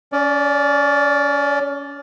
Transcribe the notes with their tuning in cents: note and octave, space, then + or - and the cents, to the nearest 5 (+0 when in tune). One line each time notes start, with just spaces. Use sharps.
C#4 +25 D5 -10